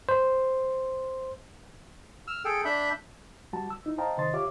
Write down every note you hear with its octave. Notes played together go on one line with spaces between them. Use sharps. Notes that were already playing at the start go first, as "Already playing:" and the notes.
C5
E6 F6
G#4 A4 G5
D4 E5 B5 G6
G3 F#4 A5
E6
D#4 E4
C5 D#5 F5 G5 A5 A#5
C3 D#3 C5 D#5 C6 A6
F4 G4 C#5 E5 F5 D6